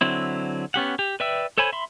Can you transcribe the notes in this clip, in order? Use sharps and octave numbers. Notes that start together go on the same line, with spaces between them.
D3 F#3 C4 E4
B3 C#4 G4 F#5
G4
B4 D5 E5 G5 E6
A4 C5 C#5 G#5 B5
E5 B5 C6